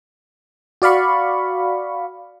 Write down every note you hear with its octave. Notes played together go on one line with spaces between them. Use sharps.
F#4 D5 F5 B5 C#6